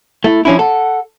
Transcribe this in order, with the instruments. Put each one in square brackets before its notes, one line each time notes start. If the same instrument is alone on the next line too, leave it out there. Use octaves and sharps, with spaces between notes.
[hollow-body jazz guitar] A3 [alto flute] E4
[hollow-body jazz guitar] F3 C#4 E4 [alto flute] D4
[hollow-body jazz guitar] A4 [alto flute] F#5